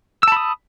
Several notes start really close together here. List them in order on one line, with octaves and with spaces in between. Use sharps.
E6 A5 B5 D#6